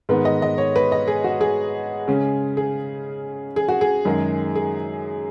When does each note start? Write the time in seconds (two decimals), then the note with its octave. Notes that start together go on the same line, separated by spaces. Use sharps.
0.09 G#2 D#3 B3 B4
0.25 D#5
0.42 D#5
0.58 C#5
0.76 B4
0.92 D#5
1.08 G#4
1.24 F#4
1.41 G#4
2.08 C#3 G#3 C#4
2.57 G#4
3.56 G#4
3.68 F#4
3.81 G#4
4.05 F#2 D#3 G#3
4.56 G#4